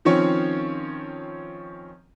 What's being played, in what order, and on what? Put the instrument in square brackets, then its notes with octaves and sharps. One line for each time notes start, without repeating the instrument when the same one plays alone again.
[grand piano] D#3 F3 C4 C#4 C#5